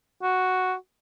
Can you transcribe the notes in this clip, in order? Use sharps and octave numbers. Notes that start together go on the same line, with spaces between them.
F#4